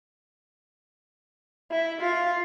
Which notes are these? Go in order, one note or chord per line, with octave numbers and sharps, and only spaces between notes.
E4
F4